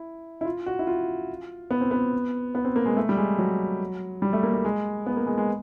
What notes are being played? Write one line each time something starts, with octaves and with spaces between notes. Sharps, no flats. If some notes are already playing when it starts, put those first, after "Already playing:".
Already playing: E4
E4
F4
F#4
E4
F4
B3
C4
B3
B3
C4
A#3
G#3
A3
G3
G#3
F#3
G3
A3
A#3
A3
G#3
B3
A#3
G#3
G#3